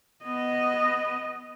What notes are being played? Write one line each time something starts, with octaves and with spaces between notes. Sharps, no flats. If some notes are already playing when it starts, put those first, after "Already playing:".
B3 D#5